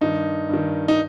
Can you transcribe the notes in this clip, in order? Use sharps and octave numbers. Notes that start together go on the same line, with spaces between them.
G2 D#3 D#4
G2 D#3
D#4